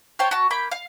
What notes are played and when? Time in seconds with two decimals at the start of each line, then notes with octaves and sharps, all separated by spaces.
0.19 C5 C#5 G5 A5
0.31 F#4 A5
0.51 A#3 B5 G6
0.71 F5